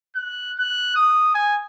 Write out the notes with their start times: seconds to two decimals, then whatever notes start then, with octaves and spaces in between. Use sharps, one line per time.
0.16 F#6
0.59 F#6
0.96 D#6
1.34 G#5